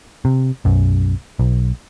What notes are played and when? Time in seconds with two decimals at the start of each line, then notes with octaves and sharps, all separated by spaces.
0.25 C3
0.65 B1 F#2
1.39 B1